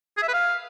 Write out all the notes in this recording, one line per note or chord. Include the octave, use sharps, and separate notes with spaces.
G#4
E5
B4
F5